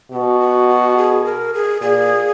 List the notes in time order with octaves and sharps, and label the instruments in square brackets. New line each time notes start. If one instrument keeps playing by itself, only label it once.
[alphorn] B2 [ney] G4
[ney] F#4
F#4
F#4
G#4
A#4
G#4
[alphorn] A#2 [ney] G#4